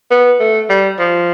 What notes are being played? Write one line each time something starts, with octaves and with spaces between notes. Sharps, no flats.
B3
A3
G3
F3